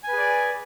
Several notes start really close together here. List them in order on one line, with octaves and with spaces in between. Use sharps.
G#5 B4 G#4 D5